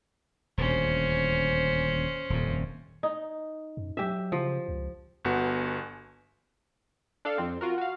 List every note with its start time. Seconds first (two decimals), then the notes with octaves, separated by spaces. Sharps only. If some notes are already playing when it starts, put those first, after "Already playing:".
0.58 D#1 D2 C#4 C5
2.30 D#1 F2
3.03 D#4
3.77 F#2
3.97 F#3 G4 E5
4.32 C#3 F3
4.68 C#2
5.25 G1 B3 F#4
7.25 D4 A4 F5
7.38 F2 C4
7.61 F4 F#4 A#4
7.78 F#4 F5